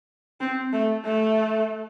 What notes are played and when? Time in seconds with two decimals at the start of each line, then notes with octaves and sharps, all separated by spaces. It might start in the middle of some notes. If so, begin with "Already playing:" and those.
0.41 C4
0.73 A3
1.05 A3